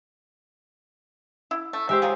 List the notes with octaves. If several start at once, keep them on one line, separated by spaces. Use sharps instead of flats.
E4
A3
G#3 G4 C5 E5
F#3 F4 G#4